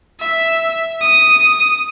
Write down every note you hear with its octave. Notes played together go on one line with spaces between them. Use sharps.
E5
D#6